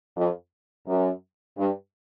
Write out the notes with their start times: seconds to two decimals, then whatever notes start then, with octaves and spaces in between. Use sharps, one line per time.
0.17 F2
0.87 F#2
1.58 G2